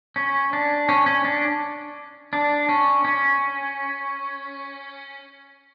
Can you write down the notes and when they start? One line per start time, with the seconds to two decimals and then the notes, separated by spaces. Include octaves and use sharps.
0.16 C#4
0.53 D4
0.89 C#4
1.06 C#4
1.25 D4
2.33 D4
2.69 C#4
3.05 C#4